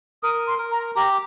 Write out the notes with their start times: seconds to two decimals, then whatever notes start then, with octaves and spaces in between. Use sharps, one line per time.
0.23 A#4 D#6
0.47 C6
0.59 A#4
0.71 A#5
0.95 G4 A#5